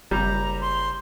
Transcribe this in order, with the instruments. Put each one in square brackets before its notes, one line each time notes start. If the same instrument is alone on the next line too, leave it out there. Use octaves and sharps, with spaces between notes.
[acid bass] F#1 [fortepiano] G3 [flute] A#5
[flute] C6